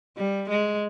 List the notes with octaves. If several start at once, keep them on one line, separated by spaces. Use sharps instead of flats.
G3
G#3